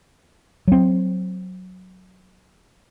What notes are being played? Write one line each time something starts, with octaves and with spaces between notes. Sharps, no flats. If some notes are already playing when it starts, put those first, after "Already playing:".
F#3 C4